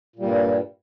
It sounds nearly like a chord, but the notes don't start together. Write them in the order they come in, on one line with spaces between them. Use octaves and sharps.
A#2 G3 G2